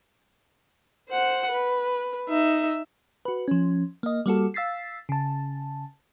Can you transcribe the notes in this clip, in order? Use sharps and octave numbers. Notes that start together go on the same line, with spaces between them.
C5 F#5
B4
D#4 E5
F#4 B4
F3 C#4
A#3 D#5
G3 A#3 F#4 A4
F5 E6 A6 B6 C7
C#3 A5